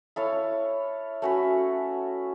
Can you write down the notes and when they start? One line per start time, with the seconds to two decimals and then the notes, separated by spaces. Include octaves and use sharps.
0.16 E4 A4 C#5 F5
1.22 A3 C#4 F#4 B4